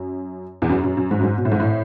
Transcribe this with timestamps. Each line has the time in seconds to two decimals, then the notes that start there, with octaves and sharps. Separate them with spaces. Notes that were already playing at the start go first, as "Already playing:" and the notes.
Already playing: F#2
0.62 E2
0.69 F#2
0.84 F#2
0.97 F#2
1.11 G#2
1.19 F#2
1.23 G#2
1.38 B2
1.45 A2
1.52 G#2
1.60 A2